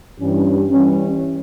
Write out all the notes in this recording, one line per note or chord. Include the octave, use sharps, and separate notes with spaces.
G2 E3 G3 C#4 G4
E3 G3 C#4